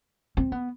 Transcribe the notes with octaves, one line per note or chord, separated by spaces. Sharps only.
C4
B3